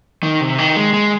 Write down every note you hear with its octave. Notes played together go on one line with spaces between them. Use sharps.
D#3
C3
D#3
G#3
G#3